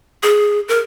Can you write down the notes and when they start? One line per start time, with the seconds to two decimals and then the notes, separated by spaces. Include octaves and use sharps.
0.23 G#4
0.68 A#4